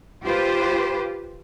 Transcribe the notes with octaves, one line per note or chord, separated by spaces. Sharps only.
F4 G4 B4 C5